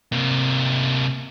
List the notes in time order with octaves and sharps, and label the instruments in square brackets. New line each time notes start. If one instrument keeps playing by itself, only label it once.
[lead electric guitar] C3 A#3